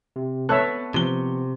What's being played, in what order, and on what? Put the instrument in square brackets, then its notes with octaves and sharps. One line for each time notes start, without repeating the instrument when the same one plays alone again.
[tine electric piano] C3
[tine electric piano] B3 C#6 [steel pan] A4 C#5 E5 [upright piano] B4 A5 F#6
[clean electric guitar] C3 [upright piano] F3 G7